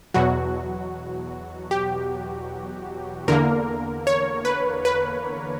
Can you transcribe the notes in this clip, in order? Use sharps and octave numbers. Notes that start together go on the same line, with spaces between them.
E2 B2 F#3 F#4
G4
E2 D3 A#3 A#4
C#5
B4
B4